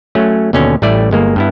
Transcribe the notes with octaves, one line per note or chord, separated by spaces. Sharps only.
F#3 A3 C#4
D#2 B2 D3 C#4
A1 G3 A3 E4 D5
G1 G#3 A#3
G2 B3 E4